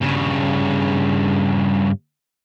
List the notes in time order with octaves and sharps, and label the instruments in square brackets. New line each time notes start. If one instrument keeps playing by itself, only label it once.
[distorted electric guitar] G2 C#3